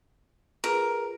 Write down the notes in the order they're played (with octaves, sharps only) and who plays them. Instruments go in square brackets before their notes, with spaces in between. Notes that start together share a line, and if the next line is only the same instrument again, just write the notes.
[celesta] F4 G#4 B4 [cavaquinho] A#4